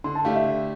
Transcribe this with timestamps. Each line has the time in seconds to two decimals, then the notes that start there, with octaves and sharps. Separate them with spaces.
0.04 D3 C6
0.15 A5
0.25 A3 D4 G4 F5
0.36 E5
0.45 D3